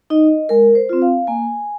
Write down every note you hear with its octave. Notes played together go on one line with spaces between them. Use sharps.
D#4 D#5
G#3 A#4
C5
C4 F4
F5
A#3 G#5